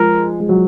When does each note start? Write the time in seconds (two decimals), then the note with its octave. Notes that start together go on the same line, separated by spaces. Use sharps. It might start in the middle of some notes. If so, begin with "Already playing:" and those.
Already playing: F3 G#3 A#4
0.40 G#3
0.49 F#3